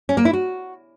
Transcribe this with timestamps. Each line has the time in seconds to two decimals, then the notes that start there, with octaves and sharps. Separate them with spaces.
0.09 C#4
0.17 A#3
0.25 E4
0.33 F#4